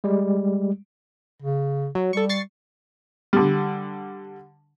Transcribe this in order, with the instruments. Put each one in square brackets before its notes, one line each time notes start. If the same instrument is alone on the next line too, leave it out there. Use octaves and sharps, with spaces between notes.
[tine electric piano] G3 G#3
[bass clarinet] C#3
[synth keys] F#3
[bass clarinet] G3 [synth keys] A4 C#6
[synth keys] C#6 A6 C7
[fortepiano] D3 G3